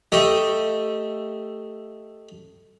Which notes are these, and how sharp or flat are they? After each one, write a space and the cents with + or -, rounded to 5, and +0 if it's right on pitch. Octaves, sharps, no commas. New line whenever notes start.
A3 +5 G4 +0 D#5 +0